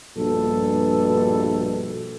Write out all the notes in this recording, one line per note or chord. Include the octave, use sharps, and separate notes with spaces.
A#1 G2 B2 A4